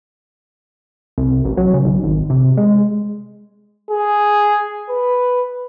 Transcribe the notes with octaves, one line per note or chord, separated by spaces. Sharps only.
C2
A1
F#3
C#3
B1
G#1
C3
G#3
G#4
B4